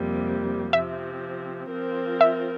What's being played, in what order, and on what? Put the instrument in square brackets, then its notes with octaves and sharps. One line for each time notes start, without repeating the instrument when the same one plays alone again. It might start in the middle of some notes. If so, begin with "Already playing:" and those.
Already playing: [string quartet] F2 C3 G3 A#3
[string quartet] C3 F3 C4 [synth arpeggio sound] E5
[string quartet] F3 C4 F4 A#4
[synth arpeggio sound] E5